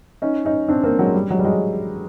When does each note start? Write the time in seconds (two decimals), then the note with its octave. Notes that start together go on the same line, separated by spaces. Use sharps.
0.22 C#4 D#4
0.45 C#4 D#4
0.68 C4 D4
0.84 A#3 C4
0.98 F#3 G#3
1.14 G3
1.30 F#3 G#3
1.39 G3
1.45 F#3 G#3